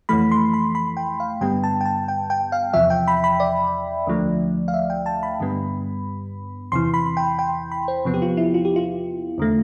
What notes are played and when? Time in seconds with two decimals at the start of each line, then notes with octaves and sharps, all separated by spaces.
0.09 F2 E3 A3 B5
0.31 C6
0.53 B5
0.75 B5
0.97 G5
1.20 F5
1.41 G2 D3 G3 B3 G5
1.64 A5
1.81 G5
1.86 A5
2.08 G5
2.30 G5
2.52 F5
2.74 E2 C3 F3 E5
2.90 G5
3.08 B5
3.24 B5
3.40 D5
4.06 D2 D3 F3 A3
4.68 F5
4.74 E5
4.90 G5
5.06 A5
5.23 B5
5.40 G2 D3 G3 B3
6.72 E2 C3 E3 C6
6.94 B5
7.17 G5
7.39 G5
7.72 B5
7.88 C5
8.05 E2 C3 F3 B3
8.14 G4
8.22 F4
8.37 E4
8.54 F4
8.65 G4
8.76 F4
9.38 E2 D3 A3